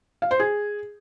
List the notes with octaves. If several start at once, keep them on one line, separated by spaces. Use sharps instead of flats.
F5
C5
G#4